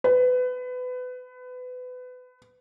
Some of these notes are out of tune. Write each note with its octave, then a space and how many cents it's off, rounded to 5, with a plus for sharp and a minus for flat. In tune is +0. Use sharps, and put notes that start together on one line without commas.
B4 +25